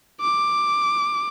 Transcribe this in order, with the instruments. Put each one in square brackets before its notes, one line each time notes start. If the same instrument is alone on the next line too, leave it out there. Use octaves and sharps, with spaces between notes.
[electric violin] D6